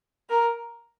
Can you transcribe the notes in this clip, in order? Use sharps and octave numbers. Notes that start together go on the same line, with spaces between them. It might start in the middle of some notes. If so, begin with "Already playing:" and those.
A#4